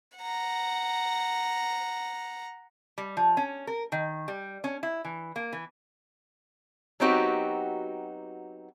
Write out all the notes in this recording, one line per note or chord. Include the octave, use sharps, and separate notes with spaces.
F#5 A#5
G3
F3
C#4
A#4
D#3
G3
C#4
E4
E3
A#3
E3
F#3 B3 C4 D#4 F#4 G4